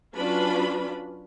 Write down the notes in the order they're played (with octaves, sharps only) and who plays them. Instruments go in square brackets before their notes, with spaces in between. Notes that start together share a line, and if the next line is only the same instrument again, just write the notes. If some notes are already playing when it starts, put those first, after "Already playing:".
[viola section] F#3 C#4 D4 F4 B4 B5